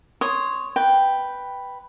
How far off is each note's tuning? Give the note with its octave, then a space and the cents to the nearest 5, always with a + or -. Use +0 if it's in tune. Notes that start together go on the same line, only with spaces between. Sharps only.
C#5 +0 C6 +0 D#6 +0
B4 +0 G5 +0